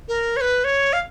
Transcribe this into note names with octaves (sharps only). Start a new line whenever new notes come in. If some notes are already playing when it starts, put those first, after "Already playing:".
A#4
C#5
B4
C#5
F5